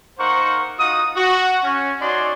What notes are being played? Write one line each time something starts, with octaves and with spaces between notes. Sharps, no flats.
A#3 D#4 A#4 C5 F#5 C#6
D#4 F4 F#4 D#6
F#4
C#4
D#4 F#4 C#5 D5 G#5 C6